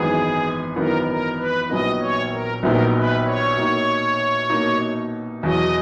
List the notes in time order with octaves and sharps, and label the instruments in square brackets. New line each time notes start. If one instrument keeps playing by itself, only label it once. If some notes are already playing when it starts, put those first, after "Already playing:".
Already playing: [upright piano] G#1 F#2 E3 B3 D#4 [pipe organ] G#4
[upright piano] G#1 F#2 E3 B3 D#4 [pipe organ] A#4
[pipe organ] A#4
B4
[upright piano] A#1 A#2 F#3 B3 D#4 [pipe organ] D#5
[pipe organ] C#5
A#4
[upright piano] A#1 A#2 F#3 B3 D#4 [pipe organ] A#4
[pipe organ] B4
C#5
[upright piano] B2 A#3 D#4
B2 A#3 D#4
[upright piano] E2 B2 F#3 [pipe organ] D#5